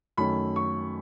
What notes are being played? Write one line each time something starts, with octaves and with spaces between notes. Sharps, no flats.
F#2 D#3 A3 C#4 B5
C#6